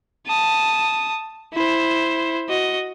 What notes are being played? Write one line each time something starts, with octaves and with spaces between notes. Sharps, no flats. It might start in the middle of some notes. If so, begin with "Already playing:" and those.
A5 D#6
E4 C5
F#4 D#5